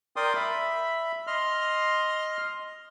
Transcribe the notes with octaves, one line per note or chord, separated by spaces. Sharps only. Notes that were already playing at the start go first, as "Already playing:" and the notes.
A#4 D5 G5 C6 D6 D#6
E5 B5
D#5 C6 F6